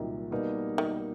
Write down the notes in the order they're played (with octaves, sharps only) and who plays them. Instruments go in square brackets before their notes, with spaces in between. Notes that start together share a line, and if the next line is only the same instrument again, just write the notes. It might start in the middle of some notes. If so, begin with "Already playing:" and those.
Already playing: [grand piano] C2 A#2 F#3 [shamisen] D#3
[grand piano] B2 G3 A#3 D#4
[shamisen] D#3